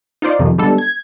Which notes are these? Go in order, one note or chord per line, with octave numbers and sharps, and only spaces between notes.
D#4 F4 C5 D5 F5
F2 C3 D#3 F3
D3 G3 G#3 B3 A4
G#6